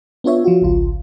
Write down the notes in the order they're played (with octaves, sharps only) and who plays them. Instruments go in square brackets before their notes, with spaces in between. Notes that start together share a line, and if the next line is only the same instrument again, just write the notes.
[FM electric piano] B3 D4 F4 C#5 E5
F3 F4 F#4
G#1 C#2 F4